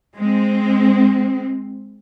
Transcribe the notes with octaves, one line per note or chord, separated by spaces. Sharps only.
G#3 C4